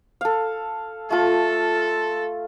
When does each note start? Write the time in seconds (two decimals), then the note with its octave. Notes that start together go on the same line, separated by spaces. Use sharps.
0.21 A4 F5
1.10 A3 F4 A4